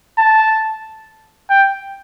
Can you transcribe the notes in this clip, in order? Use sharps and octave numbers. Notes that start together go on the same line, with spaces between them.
A5
G5